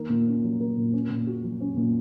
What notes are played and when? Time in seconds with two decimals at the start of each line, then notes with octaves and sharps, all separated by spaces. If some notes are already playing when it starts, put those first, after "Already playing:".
Already playing: D#3 A#3
0.09 A#2
0.27 C#4
0.43 F#3
0.60 A#3
0.77 A#2
0.93 C#4
1.10 A#2
1.27 F#4
1.43 F#3
1.61 C#4
1.77 A#2